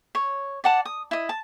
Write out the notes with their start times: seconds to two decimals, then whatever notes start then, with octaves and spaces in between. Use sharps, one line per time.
0.15 C#5
0.64 D5 F#5 A5
0.85 D#6
1.11 E4 D#5
1.29 A5